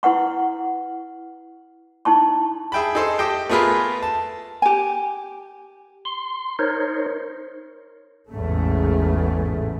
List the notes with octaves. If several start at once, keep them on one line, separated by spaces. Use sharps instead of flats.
E4 B4 F#5 C#6
D#4 E4 A5 C#6
G#4 E5 G5 A5 B5
D#4 G#4 A4 C5
G4 D#5 G5 A5
A3 B3 F4 G#4 A#4 B4
A5
G4 G#5
C6
D#4 A#4 C5 C#5
A1 E2 G#2 C#3 A3